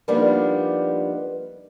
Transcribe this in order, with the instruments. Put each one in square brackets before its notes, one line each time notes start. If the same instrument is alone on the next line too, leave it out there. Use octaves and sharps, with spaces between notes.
[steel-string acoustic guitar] F3 G3 A#3 B3 D4 D#4